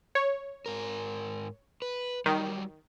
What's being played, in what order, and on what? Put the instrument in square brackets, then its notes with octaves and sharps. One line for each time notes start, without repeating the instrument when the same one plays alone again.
[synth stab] C#5
[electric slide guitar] G#2 A#4
B4
[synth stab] D#3 [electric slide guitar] F#3 G3